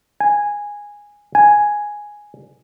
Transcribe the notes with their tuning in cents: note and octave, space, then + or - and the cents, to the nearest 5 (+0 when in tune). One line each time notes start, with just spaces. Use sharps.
G#5 -10
G#5 +0